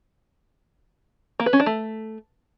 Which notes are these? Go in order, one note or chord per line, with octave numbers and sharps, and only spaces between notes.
A#3
B4
C#4
D4
A3